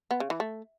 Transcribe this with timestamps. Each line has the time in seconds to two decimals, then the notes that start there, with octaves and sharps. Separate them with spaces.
0.11 B3
0.20 C#3
0.30 E3
0.40 A3